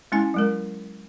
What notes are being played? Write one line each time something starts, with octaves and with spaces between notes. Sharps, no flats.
G#3 C#4 E4 G#5
F#3 G#3 A#4